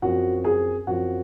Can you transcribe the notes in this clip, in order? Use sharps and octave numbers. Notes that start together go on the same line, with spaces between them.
F#2 F3 C4 F#4 F#5
G#4 G#5
F#2 F3 C4 F#4 F#5